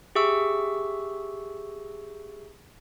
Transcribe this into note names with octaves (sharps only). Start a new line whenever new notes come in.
G4 G#4 E5 C#6 E6